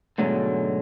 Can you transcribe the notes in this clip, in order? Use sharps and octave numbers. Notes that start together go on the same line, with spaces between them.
G#2 B2 D3 F#3 G#3 A3